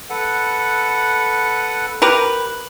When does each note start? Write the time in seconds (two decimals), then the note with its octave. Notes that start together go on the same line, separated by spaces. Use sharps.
0.10 A4 B4 F#5
2.02 G4 A#4 B4